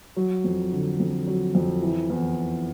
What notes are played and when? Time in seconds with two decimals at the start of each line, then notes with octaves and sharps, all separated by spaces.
0.17 F#3
0.44 F2
0.72 D3
1.00 F2
1.27 F#3
1.55 F2
1.82 E3
2.10 E2